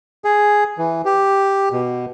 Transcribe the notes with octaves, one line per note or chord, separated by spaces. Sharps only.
G#4
E3
G4
B2